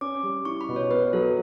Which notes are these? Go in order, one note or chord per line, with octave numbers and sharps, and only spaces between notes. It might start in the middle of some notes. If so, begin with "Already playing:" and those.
C#4 D6
G3
E4 C#6
B5
B2
C#5
B3 B4
F#3 A4